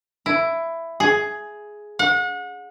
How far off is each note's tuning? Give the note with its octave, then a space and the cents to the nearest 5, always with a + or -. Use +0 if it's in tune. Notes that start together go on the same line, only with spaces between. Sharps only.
E4 +10
G#4 +10
F#5 -35